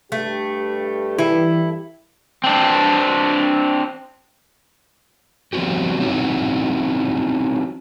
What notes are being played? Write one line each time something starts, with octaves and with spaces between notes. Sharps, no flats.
G2 A3 G4
E3 E4 A4
C4 D4
F3 B3 C4 F#4 G4
F#3 C4 C#4 D#4 E4 F#4